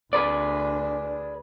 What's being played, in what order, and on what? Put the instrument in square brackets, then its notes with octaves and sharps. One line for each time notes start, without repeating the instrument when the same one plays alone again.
[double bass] D2 D4 [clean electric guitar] G#4 B4 D5